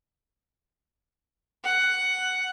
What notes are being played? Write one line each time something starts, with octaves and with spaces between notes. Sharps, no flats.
F#5